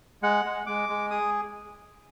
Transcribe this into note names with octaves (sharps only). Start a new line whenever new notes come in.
G#3 F#5
G#3
G#3 D6
G#3
G#4 D#6